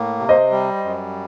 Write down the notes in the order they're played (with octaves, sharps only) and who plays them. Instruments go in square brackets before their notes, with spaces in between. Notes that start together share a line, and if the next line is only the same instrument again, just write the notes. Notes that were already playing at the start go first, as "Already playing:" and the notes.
Already playing: [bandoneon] A2 A#3
C3
[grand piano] C5 D#5
[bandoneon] G3
F#2